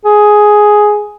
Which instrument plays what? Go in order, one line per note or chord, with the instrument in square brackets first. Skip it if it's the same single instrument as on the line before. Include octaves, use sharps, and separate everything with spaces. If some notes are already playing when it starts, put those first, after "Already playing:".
[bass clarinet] G#4